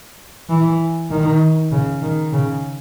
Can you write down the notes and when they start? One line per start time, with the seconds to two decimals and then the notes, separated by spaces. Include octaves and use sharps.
0.50 E3
1.11 D#3
1.72 C#3
2.02 D#3
2.33 C#3